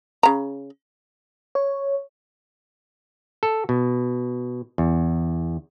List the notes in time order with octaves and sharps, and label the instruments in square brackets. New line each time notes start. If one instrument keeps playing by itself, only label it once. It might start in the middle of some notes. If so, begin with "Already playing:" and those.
[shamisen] C#3 A#5
[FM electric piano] C#5
[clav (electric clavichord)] A4
B2
E2